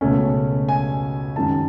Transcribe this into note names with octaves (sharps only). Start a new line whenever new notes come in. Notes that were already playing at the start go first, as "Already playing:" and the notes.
C#2 B2 A3 C#4
G#5
F#2 D#3 G#3 A5